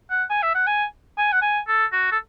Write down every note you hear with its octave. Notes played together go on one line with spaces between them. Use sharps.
F#5
G#5
E5
F#5
G#5
G#5
F#5
G#5
A4
F#4
A4